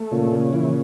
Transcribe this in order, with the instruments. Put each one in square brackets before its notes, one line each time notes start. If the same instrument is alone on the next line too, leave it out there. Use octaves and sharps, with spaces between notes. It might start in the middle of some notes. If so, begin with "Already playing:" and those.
Already playing: [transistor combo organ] A3
[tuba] A#2 [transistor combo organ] C#3
[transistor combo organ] C#3
[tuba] A#2 [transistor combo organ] E3